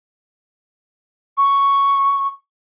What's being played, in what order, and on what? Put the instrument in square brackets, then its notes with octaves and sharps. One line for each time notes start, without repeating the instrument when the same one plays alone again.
[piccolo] C#6